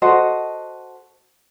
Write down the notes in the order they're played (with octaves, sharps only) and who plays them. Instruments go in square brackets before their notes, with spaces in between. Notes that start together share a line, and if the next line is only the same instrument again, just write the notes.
[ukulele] F#4 A4 C5 D#5